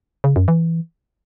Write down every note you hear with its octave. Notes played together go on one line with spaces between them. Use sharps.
C#3
F#2
E3